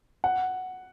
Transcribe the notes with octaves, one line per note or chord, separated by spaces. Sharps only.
F#5